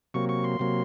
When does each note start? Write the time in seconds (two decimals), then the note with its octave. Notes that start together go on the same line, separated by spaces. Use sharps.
0.14 C3 F#3 A#3 C#6
0.29 C#6
0.44 C6
0.59 C3 F#3 A#3